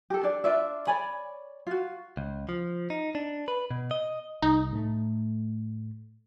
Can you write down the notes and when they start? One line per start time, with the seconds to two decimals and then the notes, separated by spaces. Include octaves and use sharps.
0.10 G4 A4
0.23 D4 D5
0.44 D4 F4 D5 E5
0.87 C#5 D5 G#5 B5
1.67 F4 F#4
2.17 C#2
2.49 F3
2.90 D#4
3.15 D4
3.48 B4
3.71 B2
3.91 D#5
4.42 C2 D#4
4.72 A2 A3